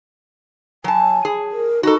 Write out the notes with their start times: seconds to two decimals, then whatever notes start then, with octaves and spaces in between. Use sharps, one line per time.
0.84 F#3 G#5 A5
1.25 G#4
1.51 A#4
1.83 D#4 F#4 A4